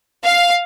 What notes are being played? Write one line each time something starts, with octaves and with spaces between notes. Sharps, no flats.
F5